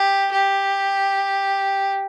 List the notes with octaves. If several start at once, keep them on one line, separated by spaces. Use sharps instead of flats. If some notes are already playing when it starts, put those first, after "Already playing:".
Already playing: G4
G4